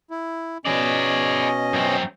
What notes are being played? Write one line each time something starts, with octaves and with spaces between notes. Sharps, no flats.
E4
B2 C#4 G#4 D5 D#5
F#2 C4